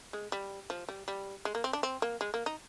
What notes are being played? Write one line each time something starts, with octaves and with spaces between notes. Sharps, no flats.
G#3
G3
F3
G3
G3
G#3
A#3
C4
D4
C4
A#3
G#3
A#3
D#4